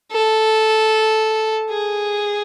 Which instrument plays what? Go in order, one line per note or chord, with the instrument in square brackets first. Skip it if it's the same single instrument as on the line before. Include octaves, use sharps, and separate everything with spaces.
[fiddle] A4
G#4